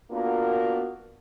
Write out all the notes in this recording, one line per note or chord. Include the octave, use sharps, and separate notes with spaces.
A#3 B3 D4 F4 F#4 A#4